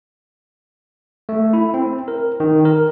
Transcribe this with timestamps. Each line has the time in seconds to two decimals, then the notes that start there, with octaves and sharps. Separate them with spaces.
1.29 A3
1.53 E4
1.74 C4
2.08 A#4
2.40 D#3
2.65 A#4